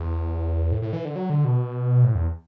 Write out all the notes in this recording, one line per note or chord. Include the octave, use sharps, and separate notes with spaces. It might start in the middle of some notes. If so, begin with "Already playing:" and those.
Already playing: E2
A2
A2
E3
D3
F#3
D3
B2
A2
E2